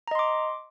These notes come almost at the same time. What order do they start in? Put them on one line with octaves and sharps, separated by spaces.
A#5 D#5 C6 D6